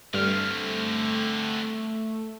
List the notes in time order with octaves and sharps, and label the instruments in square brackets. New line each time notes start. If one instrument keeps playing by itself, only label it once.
[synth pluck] G2 F6 [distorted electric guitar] D3 C4 [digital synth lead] A3